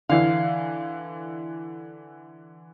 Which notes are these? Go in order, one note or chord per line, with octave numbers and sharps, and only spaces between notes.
D3 E3 F5